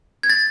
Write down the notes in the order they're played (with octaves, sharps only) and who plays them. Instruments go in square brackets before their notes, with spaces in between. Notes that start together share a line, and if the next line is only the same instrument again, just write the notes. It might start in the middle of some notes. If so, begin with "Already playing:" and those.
[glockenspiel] G#6
A6